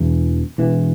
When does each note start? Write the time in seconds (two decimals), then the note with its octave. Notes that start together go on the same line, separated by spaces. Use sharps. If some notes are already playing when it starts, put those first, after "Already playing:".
Already playing: E1 E2 E3
0.58 E1 E2 E3